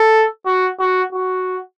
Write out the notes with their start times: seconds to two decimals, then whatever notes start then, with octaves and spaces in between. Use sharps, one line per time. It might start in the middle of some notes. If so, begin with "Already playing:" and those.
Already playing: A4
0.46 F#4
0.79 F#4
1.13 F#4